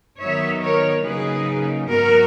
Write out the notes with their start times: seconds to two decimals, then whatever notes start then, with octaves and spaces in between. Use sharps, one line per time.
0.20 D#3 F#3 B3 D#4 C#5 E5
0.62 A#4 C#5
1.04 C#3 F#3 A#3 D#4 G#4 B4
1.88 G#2 F#3 B3 F#4 A#4